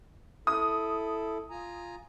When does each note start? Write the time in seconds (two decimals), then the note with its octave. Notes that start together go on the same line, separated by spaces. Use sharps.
0.47 E4 A4 D#6
1.50 F4 G#5 A#5